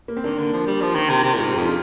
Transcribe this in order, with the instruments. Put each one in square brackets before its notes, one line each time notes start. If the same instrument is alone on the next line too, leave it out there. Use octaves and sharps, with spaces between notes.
[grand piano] A#3
C4
[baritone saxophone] D#3 [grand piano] A#3 D4
[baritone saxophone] D3
F3
G3
F3
D#3
C3
C3
A#2
[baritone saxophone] G#2 [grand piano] F4
[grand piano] G4
[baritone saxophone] F2
[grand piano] D4 F4